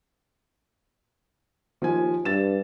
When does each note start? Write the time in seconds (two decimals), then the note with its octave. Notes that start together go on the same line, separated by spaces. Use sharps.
1.82 D#2 F3 C5 G#5
2.25 G2 A6 E7